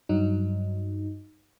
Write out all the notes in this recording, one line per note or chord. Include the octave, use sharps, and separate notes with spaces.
G2 F#3 D#4